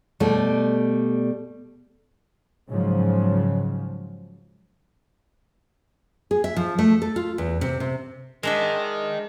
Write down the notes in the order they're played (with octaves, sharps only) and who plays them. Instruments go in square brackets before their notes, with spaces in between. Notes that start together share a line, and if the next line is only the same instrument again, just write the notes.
[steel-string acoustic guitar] B2 G3 A3 D5
[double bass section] G#2 C#3 F3 F#3
[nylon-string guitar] G#4
E5
F3
A3
A4
F4
E2
C3
C3
[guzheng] G#3 D4 E5 [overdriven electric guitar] A#4 D#5